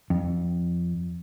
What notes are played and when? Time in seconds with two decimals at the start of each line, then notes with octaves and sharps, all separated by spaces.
0.10 F2